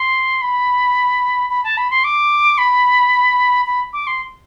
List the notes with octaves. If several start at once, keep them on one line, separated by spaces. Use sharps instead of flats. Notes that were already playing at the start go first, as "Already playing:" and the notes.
Already playing: C6
B5
B5
A5
B5
C6
D6
B5
B5
D6
C6